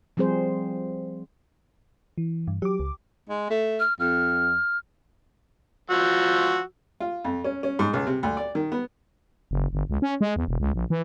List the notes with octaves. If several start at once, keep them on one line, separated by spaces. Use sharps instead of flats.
F3 G3 C4 G#4 C5
E3
G2
F#3 G4 D6
C#2
G#3
A3
F6
F2 F6
F3 F#4 E6
F4
F2
C#4
C#4
G#2
C#2
C3
D2
D5
D#3
B3
F#1
G1
C#2
C#4
G#3
E2
E1
C#2
A#1
E3